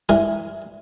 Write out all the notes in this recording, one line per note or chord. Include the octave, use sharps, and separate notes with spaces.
G2 E3 A#4 G#5